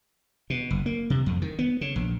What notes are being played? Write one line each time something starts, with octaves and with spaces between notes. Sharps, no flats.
B2
F#1
A#3
C3
F2
D#3
B3
C#3
A#1